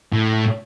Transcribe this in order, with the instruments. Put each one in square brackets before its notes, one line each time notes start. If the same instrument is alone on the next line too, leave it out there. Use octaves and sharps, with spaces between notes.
[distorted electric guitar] A2